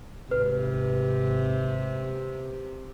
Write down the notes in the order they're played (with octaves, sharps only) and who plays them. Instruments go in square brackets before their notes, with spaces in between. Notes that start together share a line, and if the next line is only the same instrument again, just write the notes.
[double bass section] G#1 [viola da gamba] C3 [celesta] B4